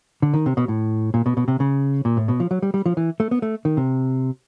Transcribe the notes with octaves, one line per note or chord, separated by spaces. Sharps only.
D3
D#3
C3
B2
A2
A#2
B2
B2
C3
C#3
A#2
A2
B2
F3
F#3
G3
G3
F3
E3
A3
B3
A3
D#3
C3